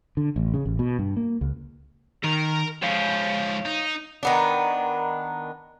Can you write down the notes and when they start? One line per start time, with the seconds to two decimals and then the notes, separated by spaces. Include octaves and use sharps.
0.17 D3
0.36 A1
0.54 C#3
0.65 A1
0.79 B2
0.99 G2
1.17 A#3
1.41 C#2
2.24 D#3 A#4 A#5
2.83 G#2 F3 C#5 F5
3.65 D#4
4.23 D#3 B3 D4